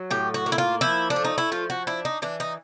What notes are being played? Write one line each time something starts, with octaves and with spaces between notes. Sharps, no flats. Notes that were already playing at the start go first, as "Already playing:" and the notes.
Already playing: F#3
A2 G4
F#4
A#3
E4
F4
F3 E4
D4
A3
D#4
E4
F3 F4
F#4
D4 E4
D#4
E3 D4
D#4